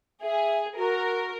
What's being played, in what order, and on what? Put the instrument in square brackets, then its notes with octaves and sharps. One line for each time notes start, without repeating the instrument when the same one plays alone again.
[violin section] G#4 [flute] E5
[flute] F#4 [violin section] A#4